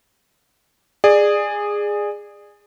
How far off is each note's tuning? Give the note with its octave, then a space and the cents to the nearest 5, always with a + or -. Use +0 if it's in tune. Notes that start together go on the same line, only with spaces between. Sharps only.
G#4 -10 D5 +20